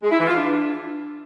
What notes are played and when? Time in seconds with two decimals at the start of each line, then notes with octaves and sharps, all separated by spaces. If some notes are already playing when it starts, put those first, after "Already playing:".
0.01 G#3
0.10 E4
0.18 E3
0.26 F4
0.35 D4